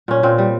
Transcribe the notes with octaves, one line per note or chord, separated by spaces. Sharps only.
A#2 C#4
A#2 C4
G3